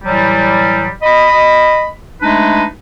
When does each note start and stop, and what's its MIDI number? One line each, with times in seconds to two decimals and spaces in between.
0.04 0.89 45
0.04 0.89 52
0.04 0.89 54
0.04 0.89 55
1.03 1.89 75
1.03 1.89 83
2.21 2.64 56
2.21 2.64 57
2.21 2.64 62
2.21 2.64 63
2.21 2.64 71